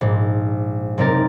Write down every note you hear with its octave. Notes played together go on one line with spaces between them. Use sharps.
A#1 G#2
F#1 C3 C4 D#4 A#4 A6